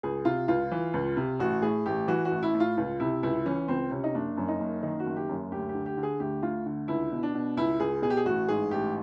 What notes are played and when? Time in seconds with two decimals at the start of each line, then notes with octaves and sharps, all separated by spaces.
0.03 C#2 G#4
0.25 C3 F4
0.48 C#2 F4
0.72 E3
0.94 C#2
1.17 C3
1.39 A1 F#4
1.62 A2 G#4
1.86 A1 G4
2.08 E3 F#4
2.25 F#4
2.31 A1
2.43 E4
2.55 A2
2.60 F4
2.77 C#2 F4
3.00 C3 E4
3.23 C#2 E4
3.46 E3 C#4
3.68 C#2 C4
3.91 C3 C#4
4.04 D#4
4.14 F#1 D4
4.37 F#2
4.48 D#4
4.60 F#1
4.82 D#3 D#4
5.00 F#4
5.06 F#1
5.16 G4
5.29 F#2
5.51 D2 G4
5.69 D3 G4
5.86 G4
5.97 D3
6.03 G#4
6.20 D2 G4
6.43 D2 F4
6.66 D3
6.88 C#2 E4
7.12 B2
7.23 D4
7.34 B2
7.57 C#2 E4
7.80 C#2 G#4
8.02 B2 G#4
8.10 G4
8.17 G#4
8.25 A1 F#4
8.48 G#2 G#4
8.71 A1 G4